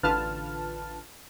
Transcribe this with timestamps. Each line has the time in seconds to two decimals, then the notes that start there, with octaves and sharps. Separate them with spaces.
0.03 A1 D3 F4 B4 A5 F6